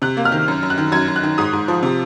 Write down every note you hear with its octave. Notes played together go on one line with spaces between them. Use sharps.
C3 F#6
A#3
F6
D#3
F#2
F#2
F#6
D#3
F#2 G#6
F#2
F#6
D#3
G#2 D#6
G#2
F3
C3